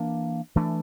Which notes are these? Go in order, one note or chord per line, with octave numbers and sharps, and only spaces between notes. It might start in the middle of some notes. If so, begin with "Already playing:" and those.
Already playing: E3 A#3 D4
E3 A3 D4